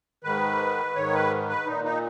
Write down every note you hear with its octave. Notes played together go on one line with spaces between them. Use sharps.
G#2 D#3 B4
G#2 D#3 C#5
B4
B4
A#2 D#4
D#4